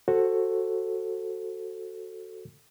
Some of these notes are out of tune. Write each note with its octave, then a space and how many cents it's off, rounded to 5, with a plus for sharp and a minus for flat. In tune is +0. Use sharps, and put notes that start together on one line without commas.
F#4 +0 A4 +5 C5 +25